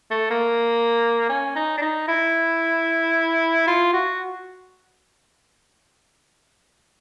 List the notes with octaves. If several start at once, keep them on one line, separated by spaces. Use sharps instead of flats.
A3
A#3
C#4
D#4
D4
D#4
E4
F4
F#4